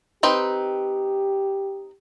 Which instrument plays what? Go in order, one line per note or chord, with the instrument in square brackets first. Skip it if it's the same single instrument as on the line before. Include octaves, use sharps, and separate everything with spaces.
[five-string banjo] C4 D#4 B4 [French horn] G4